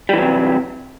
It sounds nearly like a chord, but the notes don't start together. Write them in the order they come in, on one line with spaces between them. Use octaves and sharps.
G3 E3 F#3 C3